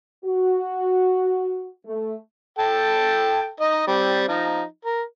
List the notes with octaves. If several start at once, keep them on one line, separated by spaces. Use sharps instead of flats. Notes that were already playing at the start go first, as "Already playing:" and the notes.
F#4
A3
A4 G5 A5
D#4 D#5
G3 C4
F3 D#4
A#4